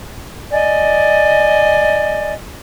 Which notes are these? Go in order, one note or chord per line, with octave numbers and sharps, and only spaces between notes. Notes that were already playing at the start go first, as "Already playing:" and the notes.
D5 D#5 G#5